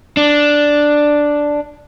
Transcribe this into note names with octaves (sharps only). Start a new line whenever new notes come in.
D4